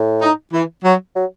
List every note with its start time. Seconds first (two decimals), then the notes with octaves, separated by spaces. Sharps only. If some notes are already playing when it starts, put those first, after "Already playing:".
Already playing: A2
0.21 D#4
0.53 E3
0.84 F#3
1.16 F#3